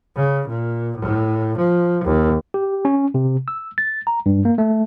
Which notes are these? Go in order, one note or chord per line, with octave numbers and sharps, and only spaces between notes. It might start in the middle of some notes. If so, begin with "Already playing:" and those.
C#3
A#2
A2
F3
D#2
G4
C#4
C3
E6
A6
A#5
G2
A#3
A3